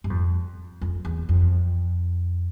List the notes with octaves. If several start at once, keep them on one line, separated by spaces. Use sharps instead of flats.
G2
F2
F2
E2
F2